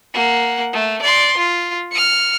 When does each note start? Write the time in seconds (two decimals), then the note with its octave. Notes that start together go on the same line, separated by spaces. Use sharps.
0.14 A#3 F#5
0.73 A3
1.02 D5 C6
1.37 F4
1.92 F6 C#7